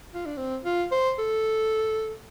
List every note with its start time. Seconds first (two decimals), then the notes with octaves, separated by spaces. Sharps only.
0.14 F4
0.26 D4
0.37 C4
0.64 F4
0.91 C5
1.18 A4